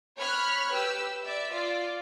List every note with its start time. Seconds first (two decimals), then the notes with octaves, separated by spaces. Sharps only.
0.19 C#5 B5 F6 F#6
0.72 G4 B4 E6
1.22 D5 E5 E6
1.54 F4 D5